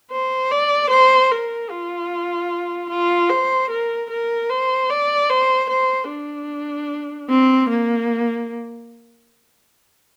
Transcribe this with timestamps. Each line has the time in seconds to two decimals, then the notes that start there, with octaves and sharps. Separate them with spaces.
0.12 C5
0.51 D5
0.90 C5
1.31 A#4
1.70 F4
2.90 F4
3.30 C5
3.70 A#4
4.10 A#4
4.50 C5
4.90 D5
5.30 C5
5.70 C5
6.09 D4
7.29 C4
7.70 A#3